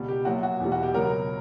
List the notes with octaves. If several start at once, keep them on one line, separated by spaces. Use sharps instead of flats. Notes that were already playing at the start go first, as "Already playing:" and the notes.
Already playing: C#2 B2 G3
G4
A#1 A#2 F#3 F#4
F#4
E2 B2 G3
F#4
G4
C#2 B2 F#3 A#4